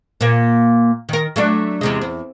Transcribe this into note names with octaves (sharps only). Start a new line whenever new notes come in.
A#2 A#3
D#3 A#4
F#3 A3 D4
E2 C3 G#3
E2